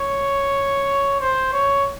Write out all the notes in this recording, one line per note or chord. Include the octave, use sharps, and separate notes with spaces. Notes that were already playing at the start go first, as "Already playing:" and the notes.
Already playing: C#5
C5
C#5